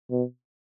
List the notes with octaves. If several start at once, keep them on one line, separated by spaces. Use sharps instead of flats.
B2